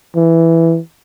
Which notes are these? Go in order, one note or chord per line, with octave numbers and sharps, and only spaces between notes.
E3